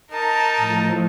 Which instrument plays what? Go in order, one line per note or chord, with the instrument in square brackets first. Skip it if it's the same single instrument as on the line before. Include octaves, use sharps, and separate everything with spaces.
[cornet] D#4 [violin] A#4 A5
[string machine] A2 F3